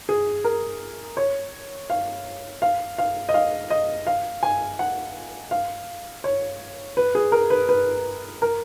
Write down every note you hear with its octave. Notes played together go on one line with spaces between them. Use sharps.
G#4
A#4
C#5
F5
F5
F5
D#5
F5
D#5
F5
G#5
F#5
F5
C#5
B4
G#4
A#4
B4
B4
A#4